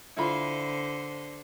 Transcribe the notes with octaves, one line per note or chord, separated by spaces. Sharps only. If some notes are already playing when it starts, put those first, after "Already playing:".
D3 E4 F4 C5 B5